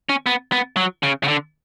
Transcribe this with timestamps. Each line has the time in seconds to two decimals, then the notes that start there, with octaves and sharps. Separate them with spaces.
0.09 C#4
0.26 B3
0.52 B3
0.77 F#3
1.03 C#3
1.24 C#3
1.28 D3